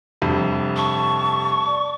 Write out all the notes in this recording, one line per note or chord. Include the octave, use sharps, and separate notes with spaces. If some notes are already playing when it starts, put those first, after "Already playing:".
F1 G2
A5 C#6
D5